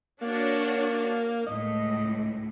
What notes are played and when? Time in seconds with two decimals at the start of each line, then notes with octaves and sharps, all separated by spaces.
0.22 A#3 D4 F#4 C#5
1.46 C#2 A2 D#5